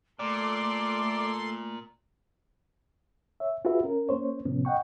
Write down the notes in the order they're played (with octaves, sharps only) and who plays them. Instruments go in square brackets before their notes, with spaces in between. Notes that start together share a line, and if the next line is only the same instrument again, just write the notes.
[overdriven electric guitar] A#2 [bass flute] A3 [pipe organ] A4 C6 [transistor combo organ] D5
[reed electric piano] C#5 E5
F4 F#4 G#4 B4 E5
C#4 A#4
A#3 C#4 C5 C#5
A2 C3 F3 B3 C#4
D#5 F#5 G5 C#6